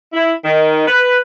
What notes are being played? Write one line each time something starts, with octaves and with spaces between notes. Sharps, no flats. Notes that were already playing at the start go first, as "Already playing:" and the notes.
E4
D#3
B4